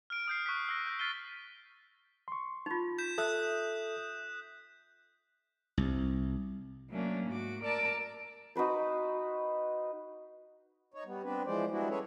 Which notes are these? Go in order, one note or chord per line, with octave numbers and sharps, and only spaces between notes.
F6 D7
D#6 G6 C7
C#6 F#6 B6 D7
E6 A#6 C7
G6
F6 A6 B6 C7 D#7 G7
C6 C#6
D#4 F4
G6 B6 E7
A4 E5 D#6 F#6 E7
C2
F#3 A3 A#3 C#4 D4
G#2 F#4 D6
A#4 D5 A5 D6 E6
D#4 F#4 B4 C5
D#4 C#5
G3 B3
B3 C4 D4 B4
E3 F3 G#3 C5 D5
G3 G#3 B3 D4 E4 F#4
C#4 G#4 A4 B4 C#5